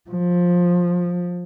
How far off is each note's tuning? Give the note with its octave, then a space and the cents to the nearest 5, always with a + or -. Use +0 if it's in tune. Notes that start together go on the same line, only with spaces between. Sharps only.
F3 +15